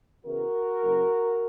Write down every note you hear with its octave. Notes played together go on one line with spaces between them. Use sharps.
E2 C#3 E3 F#4 A#4
F#1 F#2 C#3 F#3